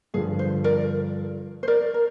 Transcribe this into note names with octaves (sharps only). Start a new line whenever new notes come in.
G2 D3 F3 G#4
C5
A#4 D5
C5
A#4 D5
A#4